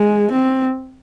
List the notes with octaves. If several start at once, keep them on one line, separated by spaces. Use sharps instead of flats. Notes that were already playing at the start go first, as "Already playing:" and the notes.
Already playing: G#3
C4